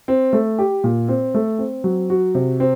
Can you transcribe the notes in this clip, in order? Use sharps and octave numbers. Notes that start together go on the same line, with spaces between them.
C4
A3
G4
A#2
C4
A3
C4
F#3
F#4
C3
C4